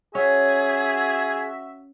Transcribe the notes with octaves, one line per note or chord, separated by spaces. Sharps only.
C#4 F#4 G#4 E5